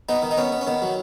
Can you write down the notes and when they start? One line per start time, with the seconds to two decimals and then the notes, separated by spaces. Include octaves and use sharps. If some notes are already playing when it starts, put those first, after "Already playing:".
0.09 B3 D#4
0.22 D#3
0.31 D#4
0.37 B3 C#4
0.52 B3
0.61 C#4
0.67 D#3 B3
0.82 F#3